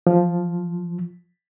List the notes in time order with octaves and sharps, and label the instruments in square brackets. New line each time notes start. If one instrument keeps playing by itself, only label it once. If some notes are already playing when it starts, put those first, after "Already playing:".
[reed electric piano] F3